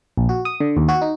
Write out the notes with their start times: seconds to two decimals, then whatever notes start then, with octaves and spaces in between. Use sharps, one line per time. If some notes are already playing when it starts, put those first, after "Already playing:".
0.17 A#1
0.29 F#4
0.45 D#6
0.60 D3
0.77 D#2
0.89 F#4
1.02 D#4